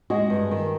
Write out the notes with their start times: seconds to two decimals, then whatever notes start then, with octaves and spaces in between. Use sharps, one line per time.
0.10 G#3 F#4 G#4
0.30 G2
0.51 D#3